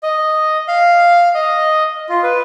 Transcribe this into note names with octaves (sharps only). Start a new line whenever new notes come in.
D#5
F5
D#5
F4
B4